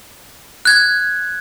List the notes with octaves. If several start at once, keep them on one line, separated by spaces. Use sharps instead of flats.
F#6 G#6